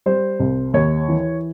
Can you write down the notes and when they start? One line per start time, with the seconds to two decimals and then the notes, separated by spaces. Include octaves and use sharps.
0.06 G3 C5
0.40 C2
0.73 D#2 C#5
1.08 E3